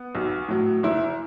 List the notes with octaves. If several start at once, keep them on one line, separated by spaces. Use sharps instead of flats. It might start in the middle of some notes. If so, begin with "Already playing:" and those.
Already playing: B3
B1
A2 F#3
F#1 E4